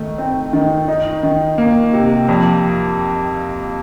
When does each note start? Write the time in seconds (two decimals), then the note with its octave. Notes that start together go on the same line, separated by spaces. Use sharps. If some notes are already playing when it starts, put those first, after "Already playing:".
Already playing: D#3 A3
0.18 C4
0.53 D#3
0.88 D#4
1.23 D#3
1.58 A#3
1.93 C3
2.29 F2